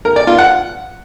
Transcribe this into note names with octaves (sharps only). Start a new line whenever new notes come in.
A#4
D5
F4
F#5